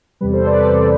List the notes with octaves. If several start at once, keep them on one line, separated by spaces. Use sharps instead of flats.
E2 C3 G3 B4
A4 C5
B4 D5
A4 C5
E2 C3 G3